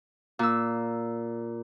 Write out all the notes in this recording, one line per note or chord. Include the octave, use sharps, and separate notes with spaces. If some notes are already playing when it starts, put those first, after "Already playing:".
A#2 E6